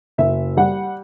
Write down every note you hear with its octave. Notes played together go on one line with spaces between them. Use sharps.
F#1 E5
G3 F#5